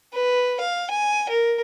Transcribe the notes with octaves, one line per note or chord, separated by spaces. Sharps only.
B4
F5
G#5
A#4